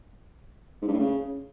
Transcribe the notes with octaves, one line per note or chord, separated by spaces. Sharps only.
G#2
G2
A2
C#3